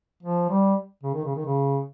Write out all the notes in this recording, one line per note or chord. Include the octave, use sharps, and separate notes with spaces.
F3
G3
C#3
D#3
C#3
D#3
C#3